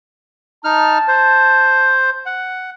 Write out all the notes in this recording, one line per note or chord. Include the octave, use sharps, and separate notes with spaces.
D#4 A5 F6
C5
F#5